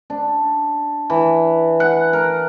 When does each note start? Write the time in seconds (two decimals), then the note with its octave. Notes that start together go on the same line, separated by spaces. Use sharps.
0.10 D4
1.10 E3
1.80 F#5
2.13 A#4